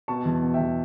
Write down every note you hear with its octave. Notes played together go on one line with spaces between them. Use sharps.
B2 A5 C#6
E2
B2
E5 G5
E2